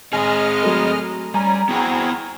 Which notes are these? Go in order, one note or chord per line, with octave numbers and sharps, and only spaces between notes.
G#3 C4 G#4 D#5 G#5 F6
F#3 A3
G3 C#4 G#5 A#5
B3 C4 E4 F#4 G#4 G#5